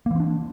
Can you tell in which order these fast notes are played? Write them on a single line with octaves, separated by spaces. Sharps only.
A#3 E3 C4 D4